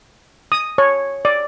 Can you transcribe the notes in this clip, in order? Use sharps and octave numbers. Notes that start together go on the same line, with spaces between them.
D#6
C#5
D5